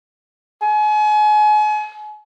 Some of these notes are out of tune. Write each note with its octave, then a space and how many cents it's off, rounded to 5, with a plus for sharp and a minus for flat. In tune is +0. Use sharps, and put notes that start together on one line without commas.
G#5 +35